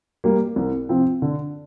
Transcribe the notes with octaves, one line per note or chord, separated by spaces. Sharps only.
G3 A#3
C2
C3 F3 C4
D3